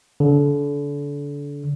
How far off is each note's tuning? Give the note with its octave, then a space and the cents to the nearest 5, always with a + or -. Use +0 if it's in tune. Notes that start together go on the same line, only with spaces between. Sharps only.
D3 -30